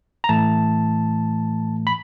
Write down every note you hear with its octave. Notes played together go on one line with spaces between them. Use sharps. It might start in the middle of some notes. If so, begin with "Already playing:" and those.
A#5
A2 E3 A3 A5
B5